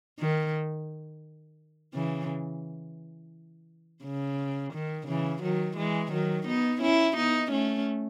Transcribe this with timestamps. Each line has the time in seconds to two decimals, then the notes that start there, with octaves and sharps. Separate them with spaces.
0.20 D#3
1.94 C#3 E3
4.04 C#3
4.73 D#3
5.07 C#3 E3
5.43 D#3 F#3
5.77 E3 G#3
6.12 D#3 F#3
6.47 B3 D#4
6.81 C#4 E4
7.17 B3 D#4
7.51 A3 C#4